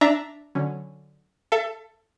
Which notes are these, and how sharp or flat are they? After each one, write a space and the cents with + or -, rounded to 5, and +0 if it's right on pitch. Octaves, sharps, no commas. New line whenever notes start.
D4 +0 E5 +0 A#5 +0
D3 +0 F#3 -5 C#4 +0
A4 +10 E5 +35